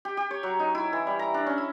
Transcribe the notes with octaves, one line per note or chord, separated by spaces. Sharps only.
G4
G4
C#5
F#3
D#4
E4
E3
G3
A#5
D4
C#4
E4